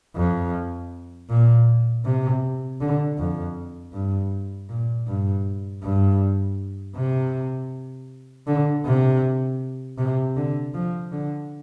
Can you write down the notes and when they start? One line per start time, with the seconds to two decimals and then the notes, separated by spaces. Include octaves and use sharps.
0.16 F2
1.29 A#2
2.05 C3
2.80 D3
3.18 F2
3.93 G2
4.69 A#2
5.07 G2
5.83 G2
6.96 C3
8.47 D3
8.85 C3
9.98 C3
10.36 D3
10.74 F3
11.11 D3